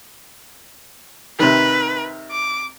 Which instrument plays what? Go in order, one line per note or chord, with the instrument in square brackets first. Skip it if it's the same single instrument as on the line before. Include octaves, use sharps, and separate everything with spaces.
[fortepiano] C3 D#3 [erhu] B4
[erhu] D6